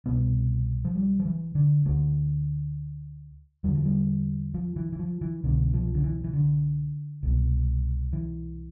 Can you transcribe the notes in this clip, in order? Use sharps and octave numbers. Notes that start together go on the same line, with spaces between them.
C2 B2 B3
F3
G3
F3
E3
D3
D2 D3 A3
E2 D3 G3
F3
G3
F3
E3
E3
F3
E3
C2 B2 D3
F3
D3
E3
E3
D3
C2 B2
E3